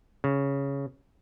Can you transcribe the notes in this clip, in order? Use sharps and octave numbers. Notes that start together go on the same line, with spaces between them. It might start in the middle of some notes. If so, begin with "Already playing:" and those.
C#3